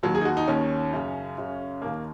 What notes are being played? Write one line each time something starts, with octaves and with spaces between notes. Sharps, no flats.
D#2 D#3 F#3
G#4
D#4
F#4
D#4
D#2 D#3 C#4
F#2 C#3
F#2 C#3
D#2 D#3 A#3